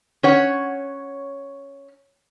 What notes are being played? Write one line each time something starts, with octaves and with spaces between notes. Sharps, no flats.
C#4 C#5 F#5